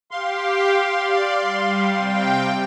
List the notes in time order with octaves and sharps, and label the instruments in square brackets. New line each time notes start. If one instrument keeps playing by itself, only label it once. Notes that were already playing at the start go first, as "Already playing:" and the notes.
[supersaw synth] G4 [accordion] F5 C6
[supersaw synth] D5
G3
C3 G5